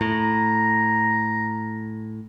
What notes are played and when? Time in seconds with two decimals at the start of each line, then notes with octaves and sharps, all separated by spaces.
0.01 A2 A#5